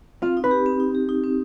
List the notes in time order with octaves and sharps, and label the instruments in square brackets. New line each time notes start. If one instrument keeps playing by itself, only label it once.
[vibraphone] C4 [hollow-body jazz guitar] F4
[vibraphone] D#4
[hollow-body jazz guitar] B4
[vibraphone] G4
C4
D#4
G4
D#4
C4